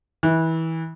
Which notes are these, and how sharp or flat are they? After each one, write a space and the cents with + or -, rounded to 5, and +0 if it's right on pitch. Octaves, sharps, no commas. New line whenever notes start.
E3 -25